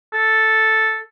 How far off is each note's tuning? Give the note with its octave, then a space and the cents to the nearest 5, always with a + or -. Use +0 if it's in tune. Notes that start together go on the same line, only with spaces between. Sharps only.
A4 +0